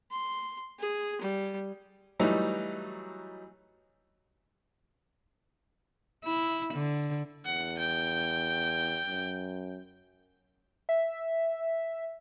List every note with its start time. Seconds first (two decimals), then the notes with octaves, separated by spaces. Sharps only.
0.11 C6
0.79 G#4
1.21 G3
2.19 E3 F#3 G3 A3 D#4
6.24 E4
6.74 D3
7.46 E2 F#5
7.79 G5
9.07 F#2
10.89 E5